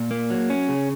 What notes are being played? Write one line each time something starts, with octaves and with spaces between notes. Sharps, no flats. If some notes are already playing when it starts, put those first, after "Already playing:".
Already playing: A#2
A#3
F#3
C#4
C#3